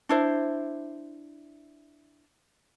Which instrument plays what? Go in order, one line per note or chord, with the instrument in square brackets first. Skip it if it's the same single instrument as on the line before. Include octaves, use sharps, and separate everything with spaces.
[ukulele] D4 E4 C5